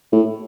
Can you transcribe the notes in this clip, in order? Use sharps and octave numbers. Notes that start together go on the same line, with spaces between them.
A2